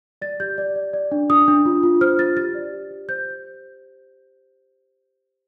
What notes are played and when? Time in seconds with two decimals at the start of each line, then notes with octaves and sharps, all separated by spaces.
0.21 D5 A6
0.40 G4 G6
0.58 D5
0.76 D5
0.93 D5
1.12 D4
1.29 D4 D#6
1.48 D4
1.65 F4
1.83 F4
2.01 C5 F6
2.19 F4 A6
2.37 G4 A6
2.55 D5
2.73 G4
2.91 G4
3.09 C5 G6